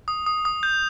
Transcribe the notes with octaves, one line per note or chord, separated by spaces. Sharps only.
D#6
D#6
D#6
G6